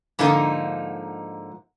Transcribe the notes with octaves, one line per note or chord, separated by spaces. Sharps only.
G#2 D3 F3 A#3 D#4